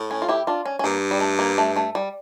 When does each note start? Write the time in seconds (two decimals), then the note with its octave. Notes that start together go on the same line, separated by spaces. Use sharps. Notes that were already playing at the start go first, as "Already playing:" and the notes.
Already playing: A2
0.11 C#4
0.22 F4
0.29 E4 G4
0.47 D4 F4
0.66 C#4
0.79 C#4
0.84 G2 A#3
1.11 G3
1.20 A3
1.39 A#3
1.58 A3
1.76 A3
1.95 G3